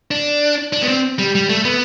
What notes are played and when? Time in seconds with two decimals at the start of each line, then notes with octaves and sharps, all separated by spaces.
0.11 D4
0.73 D4
0.82 B3
0.88 C4
1.19 G3
1.35 G3
1.49 A3
1.65 B3